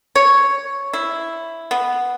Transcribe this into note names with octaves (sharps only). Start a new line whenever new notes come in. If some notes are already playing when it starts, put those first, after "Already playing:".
C#5
E4
B3